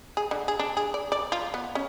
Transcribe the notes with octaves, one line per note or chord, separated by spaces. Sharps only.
G#4
D3
G#4
D4
G#4
D5
D5
F4
B3
C#4